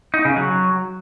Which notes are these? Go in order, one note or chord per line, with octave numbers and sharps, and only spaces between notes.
D#4
C#3
F#3